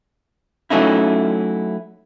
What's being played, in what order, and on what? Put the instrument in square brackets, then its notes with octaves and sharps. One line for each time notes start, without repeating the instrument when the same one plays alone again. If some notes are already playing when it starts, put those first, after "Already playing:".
[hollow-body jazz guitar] F#3 A3 C#4 D#4 E4